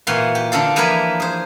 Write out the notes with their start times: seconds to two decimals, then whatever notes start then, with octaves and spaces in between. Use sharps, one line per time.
0.07 A#2 E3 F#4 F5 C6
0.35 G4
0.52 D3 D4 A4 F5
0.76 E3 F3 A#3 A#4 B4 G#5
1.20 G#4 C5